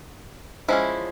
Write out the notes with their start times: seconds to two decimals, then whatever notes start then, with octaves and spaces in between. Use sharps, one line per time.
0.68 F3 G#3 C#4 E4